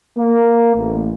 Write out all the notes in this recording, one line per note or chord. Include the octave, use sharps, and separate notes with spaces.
A#3
A1